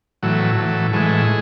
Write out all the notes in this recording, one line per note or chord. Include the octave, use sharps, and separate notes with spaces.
A2 E3 F#3
A2 E3
A2 E3 G#3